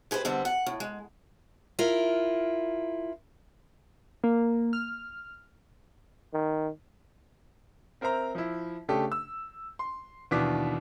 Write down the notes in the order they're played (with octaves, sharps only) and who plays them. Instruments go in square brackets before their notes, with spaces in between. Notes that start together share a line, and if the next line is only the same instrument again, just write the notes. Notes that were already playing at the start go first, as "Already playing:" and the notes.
[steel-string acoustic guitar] G4 G#4 B4 C5
D3 G3 B3 C4
F#5
A2
G#3
E4 F4 A#4
[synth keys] A#3
F6
[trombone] D#3
[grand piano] C4 A#4 C5 E5 A#5
F3 E4
C#3 A3 D4 G4 A4
E6
C6
D#2 B2 E3 D4 D6 B6